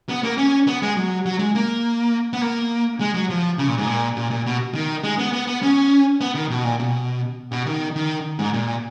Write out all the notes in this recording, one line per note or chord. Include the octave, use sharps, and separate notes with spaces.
B3
A#3
C#4
B3
G#3
F#3
F#3
G#3
A#3
B3
A#3
G#3
F#3
F3
C#3
A#2
G#2
A#2
A#2
A#2
B2
D#3
G#3
B3
B3
B3
C#4
B3
D#3
B2
A#2
B2
B2
D#3
D#3
G#2
A#2